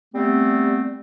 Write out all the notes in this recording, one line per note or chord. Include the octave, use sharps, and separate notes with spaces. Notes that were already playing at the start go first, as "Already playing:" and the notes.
G3 A3 B3 C4